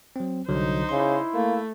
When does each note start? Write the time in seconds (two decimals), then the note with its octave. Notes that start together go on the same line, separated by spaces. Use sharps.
0.16 F#3 C4
0.48 C2 D3 F#3 D#4 C5
0.89 C#3 E4 C6
1.34 A3 A#3